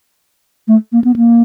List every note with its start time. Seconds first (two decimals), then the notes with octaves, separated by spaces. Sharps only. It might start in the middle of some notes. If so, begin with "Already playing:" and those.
0.68 A3
0.92 A#3
1.04 B3
1.16 A#3